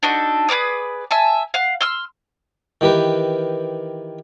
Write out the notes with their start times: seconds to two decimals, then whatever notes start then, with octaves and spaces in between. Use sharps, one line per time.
0.03 D4 D#4 F#4 A4
0.49 G#4 B4 D5 D#6
1.11 E5 G#5 A5
1.54 F5 F#5
1.81 C6 E6 F6
2.81 D#3 E3 G4 A#4 B4